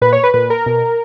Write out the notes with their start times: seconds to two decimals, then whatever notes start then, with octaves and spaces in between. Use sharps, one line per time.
0.02 A#2 B4
0.13 C#5
0.23 B4
0.34 A#2 B4
0.50 A#4
0.66 B2